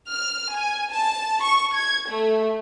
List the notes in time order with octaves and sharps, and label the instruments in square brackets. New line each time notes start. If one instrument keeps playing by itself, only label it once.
[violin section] F6
G#5
A5
C#6
G#6
A3